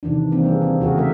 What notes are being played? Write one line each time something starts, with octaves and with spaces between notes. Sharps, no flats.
C3 D#3 E3 D4
E3 A#3 C4 D4
G3 D4 G#4
C4
C#3 F#4 G#4 A#4
A3 G4 A#4 E5